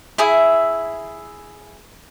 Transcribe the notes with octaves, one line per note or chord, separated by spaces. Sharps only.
E4 G#4 E5